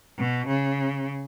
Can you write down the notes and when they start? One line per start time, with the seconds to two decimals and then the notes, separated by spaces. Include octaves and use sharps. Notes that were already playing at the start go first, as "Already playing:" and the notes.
0.19 B2
0.47 C#3